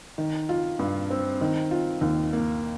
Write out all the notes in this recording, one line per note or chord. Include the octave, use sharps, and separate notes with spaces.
D#3
F4
G2
C4
D#3
F4
D#2
A#3